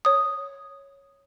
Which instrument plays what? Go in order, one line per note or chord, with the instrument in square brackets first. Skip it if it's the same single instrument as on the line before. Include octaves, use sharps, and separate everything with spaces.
[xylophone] C#5 D#6